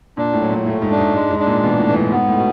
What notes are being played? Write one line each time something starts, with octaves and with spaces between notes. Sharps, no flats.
A#2 D4
A2
F#3
A#2
A2 A3
G#2
D4
G#2
G#2 G#3
G#2
D4
A#2
B2 E3
A2
E3
G#2
G#2 B3
A2
B2